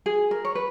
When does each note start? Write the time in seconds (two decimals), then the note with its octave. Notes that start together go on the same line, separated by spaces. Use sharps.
0.06 G#4
0.31 A#4
0.45 C#5
0.55 B4